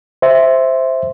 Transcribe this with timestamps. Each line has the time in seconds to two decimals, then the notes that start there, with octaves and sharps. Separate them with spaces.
0.22 C5 E5